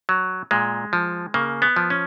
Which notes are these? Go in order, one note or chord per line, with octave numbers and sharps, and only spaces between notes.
F#3
A#2 G#3
F3
C#3 A#3
B3
F3
C#4